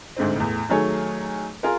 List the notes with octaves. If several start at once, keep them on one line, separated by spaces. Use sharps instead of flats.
D2 G#2 D3 C4
E2 A2
D#3 F#3 A3 G#4 C#5
F4 G#4 A#4